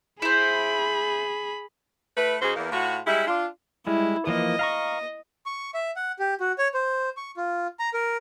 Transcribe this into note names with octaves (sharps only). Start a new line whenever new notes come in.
E4 G#4 C5 B5
A3 E4 B4
C#3 D#4 F#4 G#4 C5
E2 A#3
A2 F4 F#4
G3 G#3 E4
D4 F4
G3 G#3 E4
E3 F3 A#3 D#5
F5 A#5 C#6
C#6
E5
F#5
G4
F#4
C#5
C5
C#6
F4
A#5
A#4